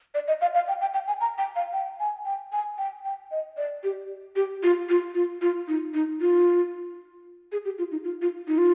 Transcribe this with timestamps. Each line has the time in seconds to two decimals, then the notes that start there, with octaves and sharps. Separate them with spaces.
0.15 D5
0.28 D#5
0.42 F5
0.55 F5
0.68 G5
0.81 G5
0.94 G5
1.08 G#5
1.21 A#5
1.38 G5
1.56 F5
1.73 G5
2.00 G#5
2.25 G5
2.52 G#5
2.78 G5
3.05 G5
3.31 D#5
3.57 D5
3.84 G4
4.36 G4
4.63 F4
4.89 F4
5.15 F4
5.42 F4
5.68 D#4
5.94 D#4
6.21 F4
7.52 G#4
7.65 G4
7.78 F4
7.92 D#4
8.04 F4
8.22 F4
8.48 D#4
8.58 F4